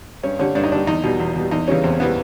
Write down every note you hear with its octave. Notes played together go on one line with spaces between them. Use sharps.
G2 C#4
D3 G3 C#4
G2 D4
D#4
D3 G3 D4
E2 D#4
B2 G3
E2
B2 G3
E2 D#4
C#3 E3 G3 C#4
E2 C4
C#3 E3 G3 B3